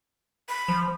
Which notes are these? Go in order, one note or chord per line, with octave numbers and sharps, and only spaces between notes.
B5
F3